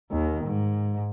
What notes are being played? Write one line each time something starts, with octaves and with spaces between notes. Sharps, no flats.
D#2 D#3
G#2